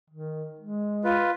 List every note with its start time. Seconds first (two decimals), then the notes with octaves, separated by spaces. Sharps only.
0.11 D#3
0.59 G#3
1.04 F4 B4